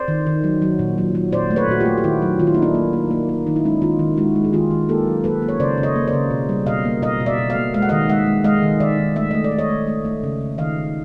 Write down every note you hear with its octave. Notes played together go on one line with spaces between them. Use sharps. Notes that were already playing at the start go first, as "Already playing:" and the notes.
Already playing: C5 D5
D#3
D#3
F#3
F#3
A#2
F#3
F#3
A#2 C5 D5
A3
B4 C#5
A#2 F#4
F4 G4
A3
G4
D#3 E4 F#4
F#3
D#3 F4
E4
A#3 D#4
D4 E4
A#3
A#3
A#3
A#3
D#3 D#4
E4
G#3 C#4 D#4
D#3 D#4 F4
D#3
G#3 E4 F#4
G#3
G#4
D#3 F4 G4
D#3
A#3 G4 A4
F#3
A#3 A4 B4
A#3
C#5
C#3 C5 D5
C#3
C#5 D#5
A#3
C5 D5
C#3
B2
G3
B2 D#5 F5
A#3
B2 D#5 F5
B2
D5 E5
B2
D#5 F5
A#3
G#3 F5
F#5
D#3 D#5 F5
G#3 E5 F#5
G#3
G#3 D#5 F5
D#3
D#3 D5 E5
D#3
A3 E5
A3 D#5
D5
A3
C#5 D#5
A3
A3
A3
C#3
C#3
D#3 D#5 F5
D#3